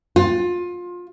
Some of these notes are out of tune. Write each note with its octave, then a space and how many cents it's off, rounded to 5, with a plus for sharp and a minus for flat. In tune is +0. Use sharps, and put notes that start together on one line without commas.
F4 +20